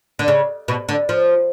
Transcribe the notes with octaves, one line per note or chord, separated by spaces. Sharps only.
D3
C#3
B2
D3
F3